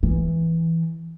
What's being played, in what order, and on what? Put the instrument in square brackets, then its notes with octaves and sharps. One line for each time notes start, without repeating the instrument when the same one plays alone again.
[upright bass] E3